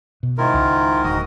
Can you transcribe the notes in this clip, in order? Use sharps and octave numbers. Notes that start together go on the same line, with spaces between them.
B2
G#2 D#3 E4 F4 A#4
C#2
D1 D2 F#4 D#5 D#6